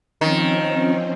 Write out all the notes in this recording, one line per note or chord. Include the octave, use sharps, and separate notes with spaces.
D#3 F3 C4 C#4